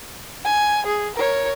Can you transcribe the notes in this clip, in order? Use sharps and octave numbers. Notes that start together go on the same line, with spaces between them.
G#5
G#4
A#4 C#5